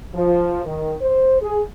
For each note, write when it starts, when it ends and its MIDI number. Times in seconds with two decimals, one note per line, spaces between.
0.15 0.61 53
0.65 0.95 51
1.01 1.37 72
1.41 1.60 68